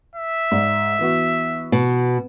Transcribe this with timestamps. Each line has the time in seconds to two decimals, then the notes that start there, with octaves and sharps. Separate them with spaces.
0.15 E5
0.51 G#2 D5
0.99 E3 B3 F#4
1.72 B2